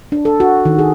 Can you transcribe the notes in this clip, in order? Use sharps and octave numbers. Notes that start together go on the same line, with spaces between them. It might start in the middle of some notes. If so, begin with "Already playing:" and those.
D4
A4
F#4
D#3
G#4